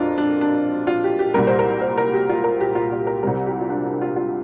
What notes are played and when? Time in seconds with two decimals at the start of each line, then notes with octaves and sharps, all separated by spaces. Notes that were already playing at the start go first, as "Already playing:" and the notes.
Already playing: F2 F3 D4 F4 A#4
0.18 D4
0.41 D4
0.87 F4
1.04 G4
1.19 G4
1.34 C2 A#2 G3 A#4
1.47 C5
1.59 A#4
1.81 C5
1.98 A#4
2.13 G4
2.29 F4
2.44 A#4
2.61 G4
2.75 F4
2.92 F4
3.07 A#4
3.23 C2 C3 G3 A#4
3.46 G4
3.61 F4
3.69 D4
3.86 D4
4.01 F4
4.16 F4